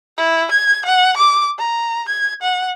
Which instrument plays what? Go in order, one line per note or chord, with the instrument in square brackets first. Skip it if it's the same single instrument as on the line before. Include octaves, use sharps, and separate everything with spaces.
[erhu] E4
G#6
F#5
D6
A#5
G#6
F#5